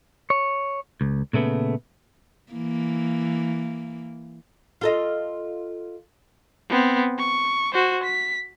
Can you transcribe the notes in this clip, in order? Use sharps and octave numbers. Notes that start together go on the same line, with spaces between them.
C#5
C#2
A#2 C#3 A3 B3
E3 A#3
F4 A4 D#5
B3 C4
C#6
F#4 C5
B6